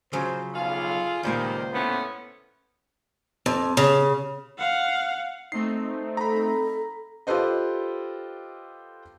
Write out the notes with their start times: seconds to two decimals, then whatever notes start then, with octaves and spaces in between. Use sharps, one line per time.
0.13 C#3 F3 F#3 C5
0.54 B1 F4 G#4 A4 F5
1.23 C#2 A#2 D#3 G3 A#3 C5
1.73 A2 A3 B3 C#4
3.46 F2
3.77 C#3
4.58 F5 F#5
5.52 A3 C4 D#4 C7
6.17 A4 A#5 B5
7.27 F4 G4 A4 B4 C5 D#5